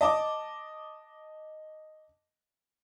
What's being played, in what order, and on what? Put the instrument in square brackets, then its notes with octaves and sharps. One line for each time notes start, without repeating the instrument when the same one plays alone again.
[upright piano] D#5 A5 D6